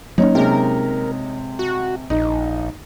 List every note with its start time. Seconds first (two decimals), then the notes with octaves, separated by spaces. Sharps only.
0.18 F#3 A#3 C#4 D#4 C#5
0.35 C3 G#3 A#4
1.59 F#4
2.10 A#1 D#4